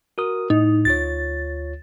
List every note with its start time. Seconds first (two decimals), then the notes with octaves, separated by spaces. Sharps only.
0.18 F#4 A#4 D#6
0.50 A2 D#4
0.85 D2 F4 C#5 A6